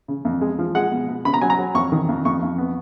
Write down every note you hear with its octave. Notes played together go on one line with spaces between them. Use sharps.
C#3
F2
G#3
F3
G#3 F#5
B2
B2
C#3 B5
A#5
F#3 G#5
A#5
F#3
F2 C#6
D#3
F2
F2 C#6
F2
B3